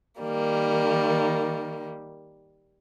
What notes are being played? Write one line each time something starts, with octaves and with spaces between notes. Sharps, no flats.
D#3 G3 A#3